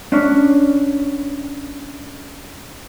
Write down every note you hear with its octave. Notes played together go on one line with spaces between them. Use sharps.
C#4 D4